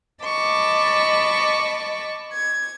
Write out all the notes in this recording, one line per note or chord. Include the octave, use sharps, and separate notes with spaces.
D#5 A5 B5 C#6 D6
G#6